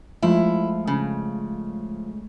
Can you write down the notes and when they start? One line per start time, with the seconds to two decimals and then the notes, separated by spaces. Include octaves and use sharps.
0.23 F3 G#3 A3 E4
0.87 C#3